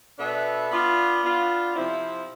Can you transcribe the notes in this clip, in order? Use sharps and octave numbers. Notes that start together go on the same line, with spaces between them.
B2 B3 D4 A4 E5
B3 D4 F4
B3 D4 F4
C3 F3 C4 E4